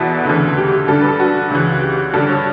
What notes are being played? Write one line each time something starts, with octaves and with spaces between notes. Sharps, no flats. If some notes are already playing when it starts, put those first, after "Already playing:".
Already playing: E2 B2 E4 F#4 A4 B4
D2 C#3 E3
G4
G2 D3 A4
B4
A4
F#4
C#2 C#3 E3
G4
G2 D3 A4
C#5